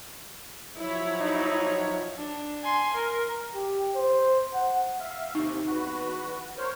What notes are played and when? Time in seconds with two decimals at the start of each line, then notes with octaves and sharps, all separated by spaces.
0.76 F3 F#3 E4 C#5
1.20 D#4
2.18 D4
2.64 G#5 C6
2.94 A#4
3.55 G4
3.95 C5
4.55 F#5
4.99 E5 F5
5.35 D#2 C3 D#4
5.67 E2 F#4 B4
6.57 A#4 C5 C#5